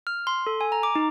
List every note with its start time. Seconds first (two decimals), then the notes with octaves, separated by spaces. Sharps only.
0.07 F6
0.27 C6
0.47 A4
0.61 G#5
0.72 A#5
0.83 D6
0.95 D#4